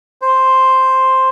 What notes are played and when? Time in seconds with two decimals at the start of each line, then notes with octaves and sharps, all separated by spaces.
0.22 C5